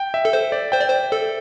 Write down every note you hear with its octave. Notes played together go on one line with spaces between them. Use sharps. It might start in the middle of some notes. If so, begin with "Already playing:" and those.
Already playing: G5
E5
A4
C5
D5
C5 G5
D5
C5
A4